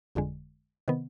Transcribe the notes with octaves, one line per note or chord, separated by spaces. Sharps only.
G1 F2 D3 G#3
C3 D#3 B3